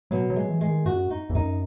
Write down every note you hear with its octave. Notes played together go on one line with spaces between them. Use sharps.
B2 F#3
F#3
G#3
E3
G#3
D#3
F#2 F#4
D#4
E2
F#2 D#4